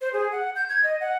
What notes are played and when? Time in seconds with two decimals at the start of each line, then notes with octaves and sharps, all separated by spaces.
0.01 C5
0.13 G#4
0.32 F#5
0.56 G6
0.69 G#6
0.84 D#5
1.01 F#5